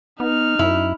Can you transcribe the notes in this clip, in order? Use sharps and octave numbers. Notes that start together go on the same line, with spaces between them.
B3 D#4 F6
F#2 E4